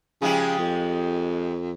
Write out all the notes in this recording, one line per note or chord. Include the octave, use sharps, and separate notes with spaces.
C#3 F3 G#3 G4
F2